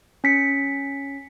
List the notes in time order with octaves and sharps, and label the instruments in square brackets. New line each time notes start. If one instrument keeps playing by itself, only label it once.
[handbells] C#4 B6 C#7